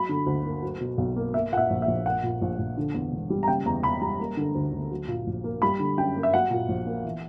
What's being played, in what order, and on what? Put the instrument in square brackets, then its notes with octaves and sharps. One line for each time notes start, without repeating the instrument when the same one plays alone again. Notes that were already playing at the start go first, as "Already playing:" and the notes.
Already playing: [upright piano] F#3 B5
D3
D2
A#3
F#3
B2
B1
A#3
A#3 E5
A#2 F#5
E5
A#1
E5
A#1
A#3 F#5
A#2
A#1
A#1
D3
E2
E1
G3
A#5
C#3 G5
E2 A#5
E1 B5
G3 A#5
A#3
D3
D2
D2
F#3
A#2
A#1
A#3
G3 B5
D3
F#2 G5
A#3
E5
F#3 F#5
A#2
A#1
A#3
E3